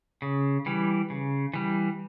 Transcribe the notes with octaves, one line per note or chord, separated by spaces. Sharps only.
C#3
E3 G3
C#3
E3 G3